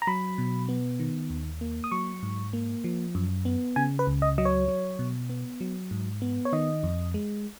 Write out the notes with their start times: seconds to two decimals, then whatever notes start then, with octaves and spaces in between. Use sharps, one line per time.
0.02 A#5
0.07 F#3 B5
0.38 B2
0.69 B3
1.00 D#3
1.30 D#2
1.61 A#3
1.84 D#6
1.92 F#3 C#6
2.23 G#2
2.53 A#3
2.84 F3
3.15 F#2
3.45 B3
3.76 C#3 G#5
3.99 B4
4.07 C#2
4.22 D#5
4.38 F#3 D#5
4.45 C#5
4.68 F#3
4.99 B2
5.29 B3
5.61 F#3
5.91 G#2
6.22 B3
6.45 C#5
6.53 D#3 D#5
6.83 F2
7.14 G#3